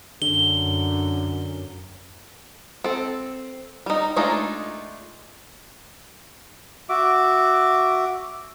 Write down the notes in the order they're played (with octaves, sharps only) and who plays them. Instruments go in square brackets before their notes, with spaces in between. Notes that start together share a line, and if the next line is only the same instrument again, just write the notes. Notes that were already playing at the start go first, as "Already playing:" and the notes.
[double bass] F#2 [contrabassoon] D3 [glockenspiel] G7
[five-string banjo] C4 A4
G3 D#4
G#3 A3 D4 D#4 F4
[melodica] F#4 E5 D6